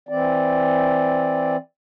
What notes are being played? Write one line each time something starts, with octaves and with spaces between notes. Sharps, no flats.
E3 C4 D5